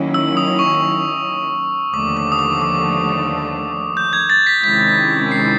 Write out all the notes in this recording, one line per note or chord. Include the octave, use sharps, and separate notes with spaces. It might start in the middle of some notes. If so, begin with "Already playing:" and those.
Already playing: D#3 F#3 A#3 C#4 E4
E6
D#6
C#6
D#2 D3 F3 A3 D6
D6
D#6
D6
D6
G6
G#6
A6
B6
C3 D#3 G#3 C#4 E4 B6
C7